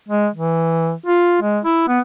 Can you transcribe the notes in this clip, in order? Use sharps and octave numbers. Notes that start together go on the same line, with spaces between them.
G#3
E3
F4
G#3
E4
B3